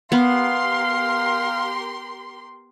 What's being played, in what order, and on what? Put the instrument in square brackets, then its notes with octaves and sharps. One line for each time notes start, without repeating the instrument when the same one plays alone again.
[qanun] B3 [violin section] G4 A#4 C6 [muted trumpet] F5